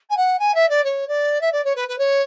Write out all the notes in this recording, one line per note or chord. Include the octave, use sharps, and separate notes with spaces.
G#5
F#5
G#5
E5
D5
C#5
D5
E5
D5
C#5
B4
B4
C#5